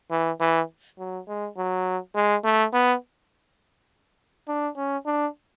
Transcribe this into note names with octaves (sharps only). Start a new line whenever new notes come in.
E3
E3
F#3
G#3
F#3
G#3
A3
B3
D4
C#4
D4